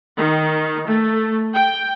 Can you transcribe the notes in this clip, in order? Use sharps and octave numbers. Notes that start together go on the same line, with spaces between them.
D#3
A3
G5